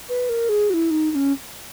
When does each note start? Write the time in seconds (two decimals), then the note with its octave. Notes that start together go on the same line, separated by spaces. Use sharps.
0.09 B4
0.29 A#4
0.49 G#4
0.70 F#4
0.74 E4
0.91 D#4
1.11 D#4
1.15 C#4